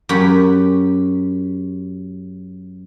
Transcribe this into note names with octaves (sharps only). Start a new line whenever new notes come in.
F#2 G4 B5